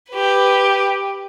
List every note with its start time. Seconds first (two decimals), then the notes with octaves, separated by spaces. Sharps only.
0.11 G4 B4